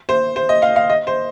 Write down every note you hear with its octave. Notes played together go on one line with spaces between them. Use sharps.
C5
C5
D#5
F5
F5
D#5
C5